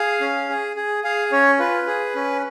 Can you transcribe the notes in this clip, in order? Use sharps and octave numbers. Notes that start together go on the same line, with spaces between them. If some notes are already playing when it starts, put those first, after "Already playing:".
Already playing: G#4 F5
C#4
G#4
G#4
G#4 F5
C#4 C#5
F4 B4
G#4
C#4